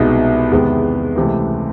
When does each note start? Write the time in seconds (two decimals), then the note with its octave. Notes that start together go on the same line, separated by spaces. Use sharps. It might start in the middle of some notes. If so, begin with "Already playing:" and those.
Already playing: C2 B2 G#3 B3 D#4
0.52 E2 C3 D#3 G#3 B3
1.16 C#2 C3 E3 A3